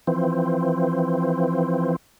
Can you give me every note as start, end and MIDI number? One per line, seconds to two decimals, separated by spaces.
0.07 1.96 52
0.07 1.96 53
0.07 1.96 60